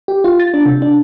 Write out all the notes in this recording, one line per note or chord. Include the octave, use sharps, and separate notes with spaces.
G4
F4
A6
D4
C3
D4